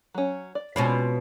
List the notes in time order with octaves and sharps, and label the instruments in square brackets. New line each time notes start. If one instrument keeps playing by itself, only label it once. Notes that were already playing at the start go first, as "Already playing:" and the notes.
[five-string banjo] F#3 C#4
D5
[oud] B2 C#4 F4 [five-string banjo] G#3 C4 B5